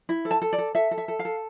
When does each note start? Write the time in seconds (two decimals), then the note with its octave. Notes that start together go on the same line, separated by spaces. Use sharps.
0.09 E4
0.25 A4
0.31 A5
0.42 A4
0.53 D5
0.58 A4
0.75 A4 E5
0.91 A4
0.98 E5
1.08 A4
1.19 F5
1.25 A4